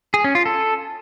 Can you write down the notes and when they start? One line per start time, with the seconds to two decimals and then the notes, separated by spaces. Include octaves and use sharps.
0.14 G#4
0.24 C#4
0.35 F4
0.46 A4